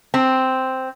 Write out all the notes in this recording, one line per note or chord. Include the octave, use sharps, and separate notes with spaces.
C4